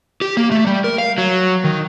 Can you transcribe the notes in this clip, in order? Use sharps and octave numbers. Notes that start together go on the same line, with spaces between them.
G4
A#3
A3
G3
A#4
F5
F#3
D#3